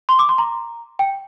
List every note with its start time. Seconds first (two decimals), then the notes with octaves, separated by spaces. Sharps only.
0.09 C6
0.19 D6
0.29 C6
0.38 A#5
0.99 G5